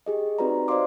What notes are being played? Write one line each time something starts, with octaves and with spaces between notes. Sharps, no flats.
G4 G#4 D#5
C4 D#4 F#4 B4 D5 A#5
C5 D5 D#5 F5 C6 D6